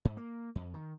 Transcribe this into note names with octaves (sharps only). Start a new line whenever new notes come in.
G#2
A#3
F2
D#3